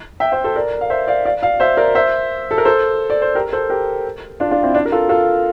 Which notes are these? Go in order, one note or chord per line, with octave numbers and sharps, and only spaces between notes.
E5 G5
C5 E5
A4 C5
A#4 D5
F5
C5 E5
D5 F5
D5 F5
D5 F5
C5 E5
A#4 D5
C5 E5
A4
A#4
A4 C5
D5
C5
G4 A#4
A4 C5
G4 A#4
D4 F4
D4 F4
C4 E4
D4
A#4
F4 A4
F4 A4